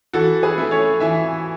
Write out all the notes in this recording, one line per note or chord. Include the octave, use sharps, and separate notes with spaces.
E3 F#4 A4
G#4 B4
A3 E4
A4 C#5
E3 E5 G#5